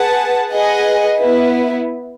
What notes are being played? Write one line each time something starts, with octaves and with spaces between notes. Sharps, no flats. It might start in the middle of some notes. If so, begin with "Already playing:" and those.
Already playing: G#4 B4 F#5 A5
G#4 B4 D#5 F#5
B3 E4 B4